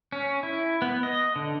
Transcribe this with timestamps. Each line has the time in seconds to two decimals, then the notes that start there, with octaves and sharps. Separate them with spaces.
0.12 C#4
0.43 E4
0.82 B3
1.03 D#5
1.36 D3